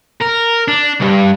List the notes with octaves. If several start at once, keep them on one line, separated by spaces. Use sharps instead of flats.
A#4
D4
C2 G2